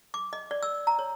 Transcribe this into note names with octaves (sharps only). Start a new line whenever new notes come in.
D6
D#5
D5
E6
A#5
C#5